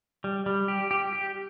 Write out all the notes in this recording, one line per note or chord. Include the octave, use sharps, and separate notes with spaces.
G3
G3
G4
G4
G4